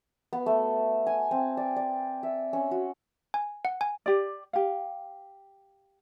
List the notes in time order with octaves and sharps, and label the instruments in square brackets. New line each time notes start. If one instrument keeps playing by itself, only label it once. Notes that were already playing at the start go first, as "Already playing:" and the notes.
[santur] B3
A3
G#5
C4
D5
D5
E5
C#4
F#4
[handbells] G#5
F#5
G#5
[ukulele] G4 D5
G4 F5